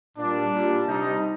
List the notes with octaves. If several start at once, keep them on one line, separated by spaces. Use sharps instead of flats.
A#2 G3 D4
A#2 G3
C3 G3 D#4